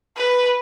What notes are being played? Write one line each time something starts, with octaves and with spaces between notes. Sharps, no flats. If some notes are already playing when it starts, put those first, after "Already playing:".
B4